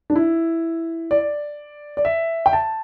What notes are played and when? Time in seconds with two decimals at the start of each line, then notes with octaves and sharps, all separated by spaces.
0.10 D4
0.16 E4
1.11 D5
1.97 D5
2.05 E5
2.46 G5
2.53 A5